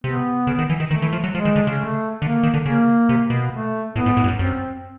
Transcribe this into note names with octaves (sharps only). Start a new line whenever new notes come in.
C3 B3
C#3
D#3
E3
D#3
D#3 A3
E3
F3
F#3
F3 G#3
D#3
D3
C#3
A3
D3 A#3
D#3
D3
C#3 A#3
C3
B2
A3
A2 B3
G#2
A2
G2
F#2
F#2 C4